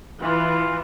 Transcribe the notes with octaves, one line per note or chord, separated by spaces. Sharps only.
E3 F4